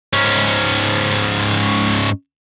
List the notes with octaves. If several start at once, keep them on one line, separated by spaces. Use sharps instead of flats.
G#2 C#4